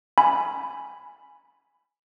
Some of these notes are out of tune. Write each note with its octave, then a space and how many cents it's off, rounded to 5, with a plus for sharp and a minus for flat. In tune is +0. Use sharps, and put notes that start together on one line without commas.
G#5 +0 B5 +0